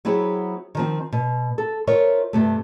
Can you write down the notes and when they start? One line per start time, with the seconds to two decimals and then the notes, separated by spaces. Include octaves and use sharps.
0.05 F#3 B3 C4 E4 G#4
0.75 D#3 F3 C4
1.12 B2
1.58 A4
1.87 F4 A#4 C5 C#5 D#5 E5
2.33 G2 C3 A3